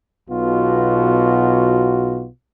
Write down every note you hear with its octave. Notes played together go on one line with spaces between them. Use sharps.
B1 B2 F4 F#4